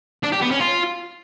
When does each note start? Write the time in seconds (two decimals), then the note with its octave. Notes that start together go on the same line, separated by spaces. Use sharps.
0.23 D4
0.32 G4
0.41 B3
0.51 C#4
0.60 F4